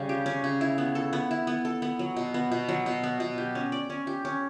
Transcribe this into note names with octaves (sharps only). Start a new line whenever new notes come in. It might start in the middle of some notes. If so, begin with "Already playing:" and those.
Already playing: C#3 G3
G4
C#4
C#3
E4
B3
A4
B3
E4
B3
A4
B3
F#3
B2
B3
B2
F#3
B2
B3
B2
G4
C#4
D5
C#4
G4
C#4